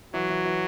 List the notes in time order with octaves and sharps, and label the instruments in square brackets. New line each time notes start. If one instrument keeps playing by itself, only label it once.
[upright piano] E3 [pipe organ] F#3
[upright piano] E3
E3